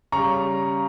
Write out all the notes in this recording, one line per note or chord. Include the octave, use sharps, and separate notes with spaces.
C#3 G3 A#5 C#6